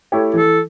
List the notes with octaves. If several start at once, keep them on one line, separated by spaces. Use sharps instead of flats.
A3 E4 G4 C#5
E3 A4